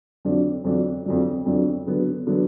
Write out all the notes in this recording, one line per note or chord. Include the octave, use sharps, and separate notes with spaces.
F2 D3 F#3 D4
F2 D3 F#3 D4
F2 D3 F#3 D4
F2 D3 F#3 D4
D3 F#3 B3
D3 F#3 B3